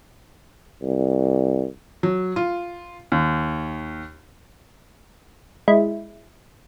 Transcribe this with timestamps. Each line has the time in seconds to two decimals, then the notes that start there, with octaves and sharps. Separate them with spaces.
0.82 C2
2.03 F#3
2.36 F4
3.12 D#2
5.68 G#3 E4